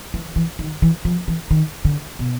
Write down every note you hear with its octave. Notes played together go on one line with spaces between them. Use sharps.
E3
E3
D#3
E3
F3
E3
D#3
D3
B2